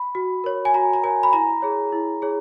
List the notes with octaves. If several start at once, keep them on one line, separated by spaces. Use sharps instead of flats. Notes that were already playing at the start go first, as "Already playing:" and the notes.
Already playing: B5
F#4
A#4 C#5
G#5
F#4 A#5
A#5
A#4 C#5 G#5
B5
E4 A#5
G#4 C#5
E4
G#4 C#5